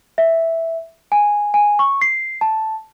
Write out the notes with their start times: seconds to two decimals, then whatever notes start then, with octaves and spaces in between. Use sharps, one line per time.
0.18 E5
1.12 G#5
1.54 G#5
1.79 C#6
2.01 C7
2.41 A5